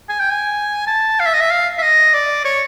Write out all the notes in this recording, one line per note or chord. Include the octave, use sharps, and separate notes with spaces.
G#5
G5
G#5
A5
F5
E5
D#5
E5
F5
E5
D#5
D5
C#5